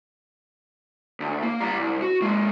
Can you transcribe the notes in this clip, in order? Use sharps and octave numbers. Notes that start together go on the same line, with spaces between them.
D2
A#3
G3 A#5
C2
F#4
G#3 A#3